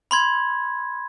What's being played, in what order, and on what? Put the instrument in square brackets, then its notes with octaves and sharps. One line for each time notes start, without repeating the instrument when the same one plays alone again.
[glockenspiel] B5 C6 G#6